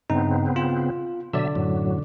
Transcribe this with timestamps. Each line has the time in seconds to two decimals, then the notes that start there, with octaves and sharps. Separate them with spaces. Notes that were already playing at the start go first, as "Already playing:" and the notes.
0.10 G2 C#3 B3 C4 D#4
0.56 F4
1.33 B2 D3 F#3 D5 E5
1.56 F#2 A2 F#3